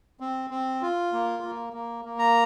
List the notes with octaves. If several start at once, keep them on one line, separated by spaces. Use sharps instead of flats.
C4
C4
F4
A#3
A#3
A#3
A#3
A#5